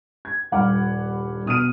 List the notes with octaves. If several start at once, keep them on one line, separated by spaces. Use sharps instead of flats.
G#6
D#1 G2 F#5 B5 D6 F6
B2 D#6 F6 D#7